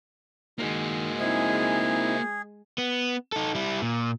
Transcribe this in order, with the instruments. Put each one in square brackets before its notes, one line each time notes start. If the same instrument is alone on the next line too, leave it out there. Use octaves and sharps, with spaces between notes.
[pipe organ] D#3 [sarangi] G#3 [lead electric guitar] A#3 F#4
[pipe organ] C4 D#4 E4 [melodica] G#4
[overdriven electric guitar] B3
D#4 A4
G3 E4
A#2